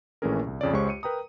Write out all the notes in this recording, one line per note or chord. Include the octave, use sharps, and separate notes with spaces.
A#1 E3 A3 C#4 G#4 A#4
C2
F2 C#3 C#5 D5
C#2 G#3 G4 C5 C#5 C#6
G4 C#7 D#7
A#4 B4 G5 A#5 D#6